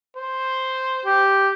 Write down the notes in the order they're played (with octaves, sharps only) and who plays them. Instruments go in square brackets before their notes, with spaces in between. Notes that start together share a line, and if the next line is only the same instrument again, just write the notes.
[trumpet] C5
[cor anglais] G4